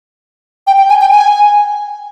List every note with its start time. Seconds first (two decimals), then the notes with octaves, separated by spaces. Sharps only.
0.67 G5
0.78 G5
0.89 G#5
1.01 G5
1.12 G#5